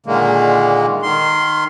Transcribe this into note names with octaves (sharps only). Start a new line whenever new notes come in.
A#2 D3 D#3 G#3 A#3
D#3 C6